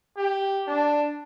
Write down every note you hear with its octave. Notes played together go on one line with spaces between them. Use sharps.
G4
D4